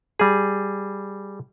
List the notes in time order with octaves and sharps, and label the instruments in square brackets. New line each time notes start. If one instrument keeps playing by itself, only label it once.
[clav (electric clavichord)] G3 G#4